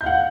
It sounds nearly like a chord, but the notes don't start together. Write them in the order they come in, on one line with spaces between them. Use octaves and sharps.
G6 F5 F#5